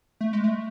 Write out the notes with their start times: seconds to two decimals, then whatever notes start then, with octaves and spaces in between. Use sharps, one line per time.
0.21 A3
0.33 G#3
0.44 A3